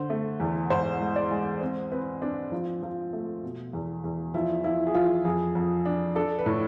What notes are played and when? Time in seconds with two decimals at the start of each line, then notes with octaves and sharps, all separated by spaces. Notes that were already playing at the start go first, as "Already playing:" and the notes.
Already playing: D3 C5
0.10 A3
0.40 E2
0.70 G#2 C5
1.01 G#3
1.16 D5
1.31 G#3
1.61 C4
1.92 C4 B4
2.22 C4 D4
2.52 F3
2.83 F3
3.13 A3
3.43 B2
3.73 E2
4.04 E2
4.34 F3 E4
4.64 F3 E4
4.87 G#4
4.94 F3 F4
5.25 F2 G#4
5.55 F2
5.85 D4
6.16 D4 A4
6.39 B4
6.46 A2